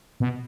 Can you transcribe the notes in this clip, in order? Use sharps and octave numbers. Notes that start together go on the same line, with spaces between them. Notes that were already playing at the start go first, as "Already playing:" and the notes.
B2